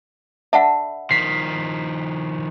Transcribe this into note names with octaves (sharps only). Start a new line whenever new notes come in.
D4 A4 E5 F#5 B5
D#3 F3 B6 C7